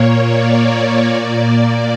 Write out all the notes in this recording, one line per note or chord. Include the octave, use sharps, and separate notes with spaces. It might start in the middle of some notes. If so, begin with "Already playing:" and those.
Already playing: A#2 A#3 C#5
D5
A#2 A#3